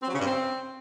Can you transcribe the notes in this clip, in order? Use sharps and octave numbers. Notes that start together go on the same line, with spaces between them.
C4
F#3
C#3
G2
C4